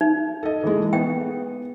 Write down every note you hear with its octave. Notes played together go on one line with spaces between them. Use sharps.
D#4
A4 D#5
E3 G#3
B3 G5